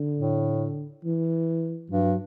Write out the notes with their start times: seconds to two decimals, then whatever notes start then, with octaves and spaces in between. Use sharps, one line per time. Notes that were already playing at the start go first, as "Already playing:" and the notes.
Already playing: D3
0.18 A2
1.04 E3
1.90 G2 F#3